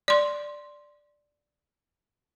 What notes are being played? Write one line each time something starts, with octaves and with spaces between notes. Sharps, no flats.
D5 C6